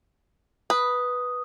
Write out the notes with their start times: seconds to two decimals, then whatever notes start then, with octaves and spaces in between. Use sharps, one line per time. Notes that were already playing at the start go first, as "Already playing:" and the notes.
0.70 B4 D#6